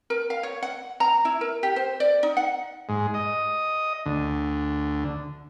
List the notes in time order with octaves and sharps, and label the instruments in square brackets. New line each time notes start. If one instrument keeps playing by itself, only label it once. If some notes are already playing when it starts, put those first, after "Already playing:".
[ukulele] A#4
F5
C#5
F#5
A#5
E4
A#4
G4
C5
D5
D#4
F#5
[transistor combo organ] G#2
D#5
D2